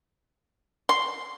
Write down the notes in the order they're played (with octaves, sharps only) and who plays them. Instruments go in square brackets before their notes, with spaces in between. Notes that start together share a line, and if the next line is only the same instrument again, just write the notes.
[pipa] C6